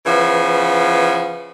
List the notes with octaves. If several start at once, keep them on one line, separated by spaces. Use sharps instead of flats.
C#3 E3 F3 B3